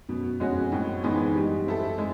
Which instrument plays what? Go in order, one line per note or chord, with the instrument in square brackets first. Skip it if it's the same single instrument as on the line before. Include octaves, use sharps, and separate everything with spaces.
[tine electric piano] F#2 [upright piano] B2
[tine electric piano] F2 [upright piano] G#3 C#4 F#4
[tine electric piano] F#2 [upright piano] A2
[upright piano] E3 G#3 B3 D#4
G3
C4 E4 A4
G#3